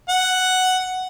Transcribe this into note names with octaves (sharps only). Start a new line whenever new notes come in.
F#5